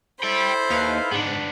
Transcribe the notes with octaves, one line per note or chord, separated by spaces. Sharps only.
E4 A4 C5 D5 G5 B5
D#2 D#4 B4 F5
G#2 B3 D4